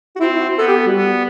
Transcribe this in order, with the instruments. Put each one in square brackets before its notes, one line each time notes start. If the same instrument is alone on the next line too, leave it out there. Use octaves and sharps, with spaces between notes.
[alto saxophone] F#4
[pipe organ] C4 [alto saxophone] E4
[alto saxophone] E4
F#4
[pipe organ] B3 [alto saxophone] A4
[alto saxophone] G4
F#4
G3
[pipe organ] B3